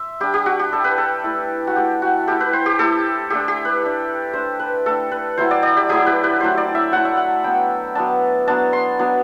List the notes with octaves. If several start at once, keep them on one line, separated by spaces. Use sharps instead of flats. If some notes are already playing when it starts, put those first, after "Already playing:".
Already playing: E5 C6
G3 D4 G4
G4
F#4
G4
G3 D4 A4
B4
A4
A3 E4
F#4
A3 E4 G4
F#4
A3 E4 G4
B4
C5
G4
A3 E4 A4
A3 D4 G4
G4
B4
A3 D4
A3 D4 C5
B4
A3 D4 A4
B4
F#3 A3 E4 C5
D5
D5
G4
F#3 A3 E4 G4
B4
B4
F#3 A3 E4 C5
D5
E5
F#3 A3 E4 F#5
E5
F#5
F#3 B3 D4 G5
F#3 B3 D4 A5
F#3 B3 D4 A5
C6
F#3 B3 D4